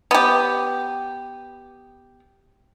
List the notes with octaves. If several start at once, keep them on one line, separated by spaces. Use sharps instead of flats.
B3 G4